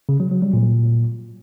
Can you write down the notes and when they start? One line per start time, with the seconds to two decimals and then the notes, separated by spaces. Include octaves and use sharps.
0.09 C#3
0.20 F#3
0.31 F#3
0.42 G3
0.53 A#2